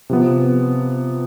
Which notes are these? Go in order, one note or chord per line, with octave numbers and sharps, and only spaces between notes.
C3 F3 B3